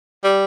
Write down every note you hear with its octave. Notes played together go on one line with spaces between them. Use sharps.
G3